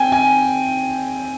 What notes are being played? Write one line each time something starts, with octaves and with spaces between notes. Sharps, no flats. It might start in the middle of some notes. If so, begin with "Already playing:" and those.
Already playing: C4 G5 G#5
G#5